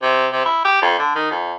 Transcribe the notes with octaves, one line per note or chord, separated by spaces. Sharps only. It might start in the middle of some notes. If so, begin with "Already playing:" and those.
C3
C3
E4
G4
F2
D3
D#3
F2